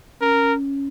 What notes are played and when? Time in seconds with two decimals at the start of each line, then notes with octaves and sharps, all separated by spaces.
0.21 C#4 A#4